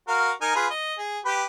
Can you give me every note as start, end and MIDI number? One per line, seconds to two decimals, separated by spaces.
0.08 0.31 66
0.08 0.31 70
0.08 0.31 77
0.41 0.51 63
0.41 0.51 70
0.41 0.51 80
0.56 0.67 65
0.56 0.67 68
0.56 0.67 71
0.70 0.94 75
0.98 1.19 68
1.25 1.45 67
1.25 1.45 71